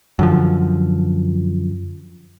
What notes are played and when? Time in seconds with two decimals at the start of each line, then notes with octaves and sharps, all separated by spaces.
0.19 F#2 D3 F3